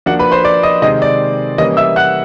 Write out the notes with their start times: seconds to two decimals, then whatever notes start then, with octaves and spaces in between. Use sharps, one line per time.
0.06 F3 A#3 D4 F#4 F#5
0.19 B4 B5
0.32 C5 C6
0.44 D5 D6
0.63 D#5 D#6
0.82 C3 D#3 G#3 C4 D#5 D#6
1.02 D5 D6
1.58 E3 G3 A#3 C#4 D#5 D#6
1.77 E5 E6
1.96 F#5 F#6